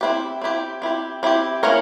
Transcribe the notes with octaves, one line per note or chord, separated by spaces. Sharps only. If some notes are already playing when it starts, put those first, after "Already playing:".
C4 E4 G4
C4 E4 G4
C4 E4 G4
C4 E4 G4
A#3 C#4 E4 A#4 C#5